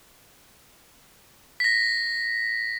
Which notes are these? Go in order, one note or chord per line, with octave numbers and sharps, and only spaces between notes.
A#6 B6